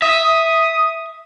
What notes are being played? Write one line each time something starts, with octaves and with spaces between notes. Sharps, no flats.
E5 D#6